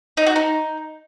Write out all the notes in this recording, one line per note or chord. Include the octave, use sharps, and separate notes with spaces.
D#4
F#4
D#4